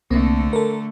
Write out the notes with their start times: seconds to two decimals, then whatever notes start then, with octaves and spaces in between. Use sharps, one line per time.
0.11 C2 D3 A3 A#3 C4
0.53 A4 A#4